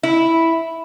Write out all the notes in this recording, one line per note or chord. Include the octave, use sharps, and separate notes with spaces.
E4